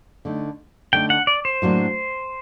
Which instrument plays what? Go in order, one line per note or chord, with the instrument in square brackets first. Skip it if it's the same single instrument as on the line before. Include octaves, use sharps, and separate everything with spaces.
[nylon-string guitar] D3 A3 D#4
[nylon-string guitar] D3 A3 D#4 [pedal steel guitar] G5
[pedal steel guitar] F#5
D5
C5
[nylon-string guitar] A2 F#3 A#3 D4